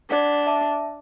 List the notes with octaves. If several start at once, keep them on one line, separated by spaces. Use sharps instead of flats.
D4 D5 F#5 B6
E5 A5 D6